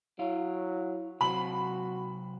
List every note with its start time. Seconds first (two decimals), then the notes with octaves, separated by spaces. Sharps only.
0.19 F#3 E4 F5
1.21 C3 F#3 F#4 C5 B5 F#7